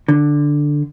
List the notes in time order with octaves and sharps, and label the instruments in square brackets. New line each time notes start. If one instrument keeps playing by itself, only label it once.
[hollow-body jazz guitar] D3